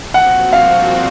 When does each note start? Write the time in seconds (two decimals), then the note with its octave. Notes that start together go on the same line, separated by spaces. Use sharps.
0.14 A#2 F3 C4 F#4 F#5
0.53 F5